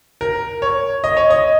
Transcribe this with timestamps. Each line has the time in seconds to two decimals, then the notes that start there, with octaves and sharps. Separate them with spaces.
0.21 A#4
0.62 C#5
1.04 D#5
1.17 C#5
1.30 D#5